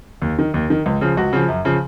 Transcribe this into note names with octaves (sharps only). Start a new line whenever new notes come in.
D#2
D#3
D#2
D#3
C#2
C#3 F3
C#2 F#4
C#3 F3
F#2
C#3 F3